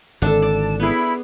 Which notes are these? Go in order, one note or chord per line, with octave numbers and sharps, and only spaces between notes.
G#1 D3 D4 A4 A5
D5
B3 E4 G#4 B5